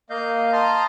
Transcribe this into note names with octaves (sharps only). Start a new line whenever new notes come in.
A#3 D#5 F5 G6
A5 A#5 C6 D#6 F6 G6